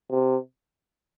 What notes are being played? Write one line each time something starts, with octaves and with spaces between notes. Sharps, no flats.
C3